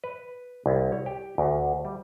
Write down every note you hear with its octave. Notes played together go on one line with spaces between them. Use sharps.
B4
C2
C#5
G4
D2
G3